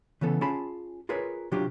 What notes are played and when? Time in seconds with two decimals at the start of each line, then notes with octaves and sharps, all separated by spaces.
0.21 C#3 E3 B3 A4
0.41 C#4 F4 G#4 F5 A5 B5
1.09 F4 G#4 A#4 B4 C#5
1.52 C3 F#3 D4 F4 G4